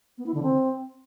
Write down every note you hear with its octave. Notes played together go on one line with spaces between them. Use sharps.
B3
E4
D3
C4